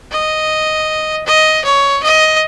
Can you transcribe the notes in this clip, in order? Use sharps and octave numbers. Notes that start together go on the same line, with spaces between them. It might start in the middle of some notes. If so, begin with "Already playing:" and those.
D#5
D#5
C#5
D#5